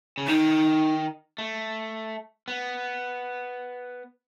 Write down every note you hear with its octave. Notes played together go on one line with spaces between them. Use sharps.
C#3
D#3 D#4
A3
B3